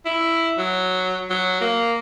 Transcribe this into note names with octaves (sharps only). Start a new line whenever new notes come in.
E4
F#3
F#3
A#3